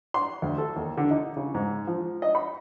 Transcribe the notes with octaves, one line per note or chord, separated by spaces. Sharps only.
C6
D2
A4
D#2
D3
D#4
C#3
G#2
F3
D#5
B5